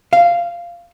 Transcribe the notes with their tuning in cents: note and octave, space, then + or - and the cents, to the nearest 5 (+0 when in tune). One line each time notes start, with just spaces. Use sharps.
F5 -10